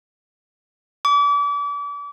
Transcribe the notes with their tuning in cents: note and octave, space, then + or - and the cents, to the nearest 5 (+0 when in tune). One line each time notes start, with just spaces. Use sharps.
D6 -35